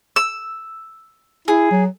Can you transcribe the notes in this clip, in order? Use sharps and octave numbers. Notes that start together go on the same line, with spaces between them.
E6
E4 G#4
F#3